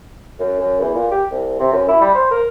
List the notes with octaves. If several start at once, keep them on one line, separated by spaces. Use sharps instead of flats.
F#2
F#2
E2
A#2
G4
C2
C3
F#2
E4
G3
C5
A#4